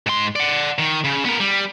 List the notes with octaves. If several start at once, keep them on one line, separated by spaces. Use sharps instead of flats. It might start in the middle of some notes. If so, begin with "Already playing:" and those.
G#2 C6
D5 F#5
D#3
C#3
B3 A#4
G3